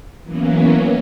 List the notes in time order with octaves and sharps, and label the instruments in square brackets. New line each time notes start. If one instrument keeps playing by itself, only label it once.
[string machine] E3 F#3 A#3 B3 C#4